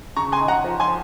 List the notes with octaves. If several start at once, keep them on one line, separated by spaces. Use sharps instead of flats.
C#3 A#5 C#6
G#5 C6
D#4
F#5 A#5
F3
G#5 C6
F3